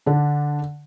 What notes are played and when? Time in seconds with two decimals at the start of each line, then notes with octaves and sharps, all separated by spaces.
0.06 D3 D4